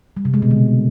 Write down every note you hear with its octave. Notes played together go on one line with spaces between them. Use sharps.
G3
C3
G#3
B2
D3